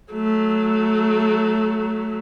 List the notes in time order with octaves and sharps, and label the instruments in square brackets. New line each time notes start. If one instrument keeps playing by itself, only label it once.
[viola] F#3 A3